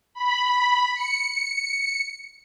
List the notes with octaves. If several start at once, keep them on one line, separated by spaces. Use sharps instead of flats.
B5
C#7